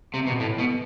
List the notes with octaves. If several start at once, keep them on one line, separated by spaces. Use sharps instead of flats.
C3
B2
A2
B2